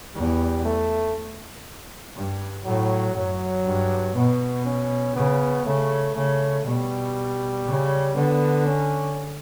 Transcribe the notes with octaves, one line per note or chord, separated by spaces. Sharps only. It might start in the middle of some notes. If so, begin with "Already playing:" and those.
E2 G3
A3
G2
A2 F#3
F#2 F#3
G2
B2 B3
C#4
C#3 B3
C#3 A3
C#3 A3
B2 G3
C#3
D3 B3
C#4